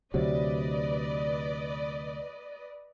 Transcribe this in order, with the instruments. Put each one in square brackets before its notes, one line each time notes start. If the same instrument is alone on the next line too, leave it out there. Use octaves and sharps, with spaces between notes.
[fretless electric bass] D2 C3 F#3 [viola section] B4 D5 D#5